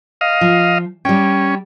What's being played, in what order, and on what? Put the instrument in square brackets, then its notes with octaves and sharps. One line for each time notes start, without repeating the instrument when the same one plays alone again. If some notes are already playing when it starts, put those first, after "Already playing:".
[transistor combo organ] D#5 F5
[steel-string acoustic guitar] F3
[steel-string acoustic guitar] G3 G5 [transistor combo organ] C#4